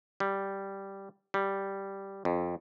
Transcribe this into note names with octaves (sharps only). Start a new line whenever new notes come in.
G3
G3
F2